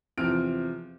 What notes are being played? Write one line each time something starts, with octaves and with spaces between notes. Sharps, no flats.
E2 C3 F3 F6 D7